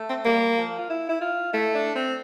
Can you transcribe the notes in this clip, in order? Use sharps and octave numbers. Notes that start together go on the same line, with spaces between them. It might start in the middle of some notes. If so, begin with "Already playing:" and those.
Already playing: A3
C4
G3 A#3
F3
F4
E4
E4
F4
A3 E4
D4
C4